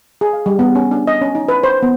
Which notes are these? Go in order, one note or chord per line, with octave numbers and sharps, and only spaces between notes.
G#4
F5
G3
B3
C#4
D4
D#5
C#4
D#4
B4
C5
B3